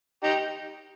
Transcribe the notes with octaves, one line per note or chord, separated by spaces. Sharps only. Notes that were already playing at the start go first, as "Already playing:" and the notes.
D#4 G4